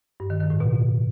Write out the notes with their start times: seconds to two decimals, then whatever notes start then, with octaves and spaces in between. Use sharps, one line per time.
0.20 G2
0.30 D#3
0.40 D#3
0.50 A2
0.60 B2